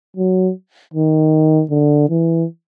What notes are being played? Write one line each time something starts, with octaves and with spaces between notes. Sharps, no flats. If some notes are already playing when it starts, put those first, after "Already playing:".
F#3
D#3
D3
E3